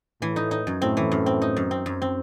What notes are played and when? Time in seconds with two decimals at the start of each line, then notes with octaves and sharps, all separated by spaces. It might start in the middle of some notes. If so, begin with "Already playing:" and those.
0.21 A2 E3
0.36 D#4
0.51 D#4
0.67 F#2
0.82 A2 C4
0.97 E3
1.12 F#2
1.26 C4
1.42 D#4
1.56 F#2
1.71 C4
1.86 F#2
2.02 C4